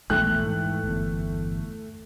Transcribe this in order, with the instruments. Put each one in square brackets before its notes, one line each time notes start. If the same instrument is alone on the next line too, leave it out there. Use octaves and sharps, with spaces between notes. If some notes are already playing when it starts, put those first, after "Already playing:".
[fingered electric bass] A#1 E2 B2 [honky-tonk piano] A3 G5 F#6
[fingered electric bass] G#2 E3
G1 E2